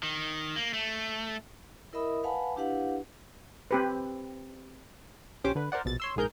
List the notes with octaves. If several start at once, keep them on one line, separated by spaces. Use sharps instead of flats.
D#3
A#3
A3
E4 A#4 D#5 E5 B5 D#6
B4 F5 F#5 G#5 A5 B5
D4 E4 G4 B4 F5 F#5
C4 G4 B4
A#1 C#4 G4 C5 D6
D3 B4
A#4 C5 D5 F#5
A#1 B2 A6
C#5 C6 E6
A#1 G#2 G#4 A#4 G6